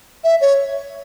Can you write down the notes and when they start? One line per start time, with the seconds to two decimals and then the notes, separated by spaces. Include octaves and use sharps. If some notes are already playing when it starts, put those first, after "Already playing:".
0.24 E5
0.41 C#5